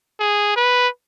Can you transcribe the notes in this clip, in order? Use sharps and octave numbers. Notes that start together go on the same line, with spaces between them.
G#4
B4